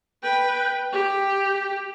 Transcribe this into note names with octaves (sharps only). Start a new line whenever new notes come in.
B4 G5
G4